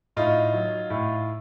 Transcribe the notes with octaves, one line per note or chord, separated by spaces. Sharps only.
A2 D#4 F4
F#3
A2